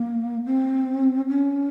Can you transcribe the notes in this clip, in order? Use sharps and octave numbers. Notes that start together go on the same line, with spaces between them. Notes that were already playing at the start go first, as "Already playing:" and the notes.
Already playing: A#3
C4
C#4